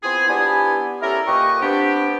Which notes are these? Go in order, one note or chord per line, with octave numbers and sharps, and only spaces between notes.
B3 C4 E4 F4 G#4
B3 D4 E4 G4 G#5
C#4 E4 G4 A4 A#4
A#2 G4 B4 D#5 C#6
B3 C4 D4 G4